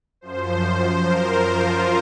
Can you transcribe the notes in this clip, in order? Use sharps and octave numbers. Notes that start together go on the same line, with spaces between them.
F#2 F3 C5
A#4
F4